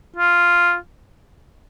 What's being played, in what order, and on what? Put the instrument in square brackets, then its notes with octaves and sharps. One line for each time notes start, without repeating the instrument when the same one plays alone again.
[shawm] F4